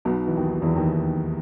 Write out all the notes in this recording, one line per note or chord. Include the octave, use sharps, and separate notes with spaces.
B1 B2
E3
D#2 D#3
E2 E3
D#2 D#3